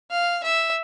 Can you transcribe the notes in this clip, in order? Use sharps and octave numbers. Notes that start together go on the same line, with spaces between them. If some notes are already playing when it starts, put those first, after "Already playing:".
F5
E5